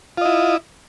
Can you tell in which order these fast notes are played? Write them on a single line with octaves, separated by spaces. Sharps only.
F4 D#5 E4